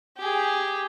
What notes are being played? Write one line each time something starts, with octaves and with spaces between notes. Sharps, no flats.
G4 G#4